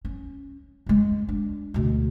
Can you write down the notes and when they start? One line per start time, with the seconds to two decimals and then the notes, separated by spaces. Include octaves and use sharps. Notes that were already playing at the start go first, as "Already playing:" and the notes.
0.05 C#4
0.86 F#2 G#3
1.28 D4
1.74 D2 B2